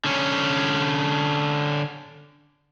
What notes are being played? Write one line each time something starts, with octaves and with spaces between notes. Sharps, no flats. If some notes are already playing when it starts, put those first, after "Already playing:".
D3 C#4